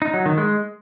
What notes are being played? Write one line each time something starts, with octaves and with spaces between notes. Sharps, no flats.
D#4
F#3
D#3
G#3